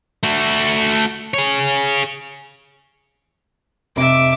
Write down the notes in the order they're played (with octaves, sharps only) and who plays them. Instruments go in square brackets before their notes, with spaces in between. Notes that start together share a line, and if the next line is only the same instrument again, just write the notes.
[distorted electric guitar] A3 F#4
G#4 C#5
[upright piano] F1 C3 [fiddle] E5 D6